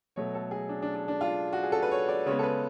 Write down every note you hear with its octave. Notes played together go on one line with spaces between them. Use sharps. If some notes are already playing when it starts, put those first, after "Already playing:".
B2 F#3 A3 C#5
A4
G#4
D4
D4
D4
D4
F4
F#4
G#4
A4
B4
C#5
D5
C#3 G#3 B3 C#5
A4
B4